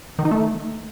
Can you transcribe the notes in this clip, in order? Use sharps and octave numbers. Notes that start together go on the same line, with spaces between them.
D#3
D#4
A3